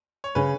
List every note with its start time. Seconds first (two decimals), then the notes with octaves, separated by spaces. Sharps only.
0.24 C#5
0.35 C#3 B4